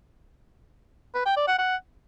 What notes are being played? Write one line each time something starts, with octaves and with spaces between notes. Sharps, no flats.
B4
G5
D5
F#5
F#5